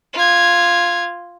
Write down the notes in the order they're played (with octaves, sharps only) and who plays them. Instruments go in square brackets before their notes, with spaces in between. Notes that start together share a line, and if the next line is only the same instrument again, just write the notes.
[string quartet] F4 G#6